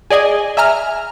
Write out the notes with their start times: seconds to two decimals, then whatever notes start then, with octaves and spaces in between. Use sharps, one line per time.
0.10 G#4 D5 D#5 G#5
0.57 E5 G#5 A#5 F6